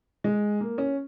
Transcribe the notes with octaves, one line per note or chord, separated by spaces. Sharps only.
G#3
A#3
C#4